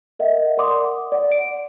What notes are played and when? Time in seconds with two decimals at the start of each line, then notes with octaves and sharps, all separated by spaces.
0.19 A#4 D#5 E5 F#5
0.57 A#4 D5 F#5 C6 D6 D#6
1.12 D5 F#5
1.32 D7